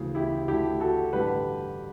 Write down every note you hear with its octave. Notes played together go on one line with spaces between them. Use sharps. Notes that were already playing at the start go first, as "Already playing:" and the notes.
Already playing: D2 C#3 E3
E4 G4
D2 D3 E4 G4
F#4 A4
A1 G2 D3 G4 B4